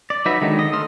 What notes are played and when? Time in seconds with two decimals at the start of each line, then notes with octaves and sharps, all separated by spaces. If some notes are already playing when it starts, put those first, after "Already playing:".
0.10 D5
0.25 F#3 D#4 F#4 B4 E5
0.41 D3 D#3 F#3 G#3 D#4
0.59 D#5
0.73 A3 A4 C6 D#6 F6